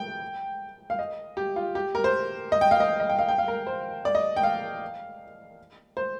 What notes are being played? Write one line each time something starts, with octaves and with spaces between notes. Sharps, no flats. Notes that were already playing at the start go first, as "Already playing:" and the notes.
Already playing: G5
F5
D#5
G4
F4
G4
A#4
C5
D#5
G5
F5
D#5
D#5
G5
F5
G5
F5
A#4
C5
D5
D#5
G5
F5
C5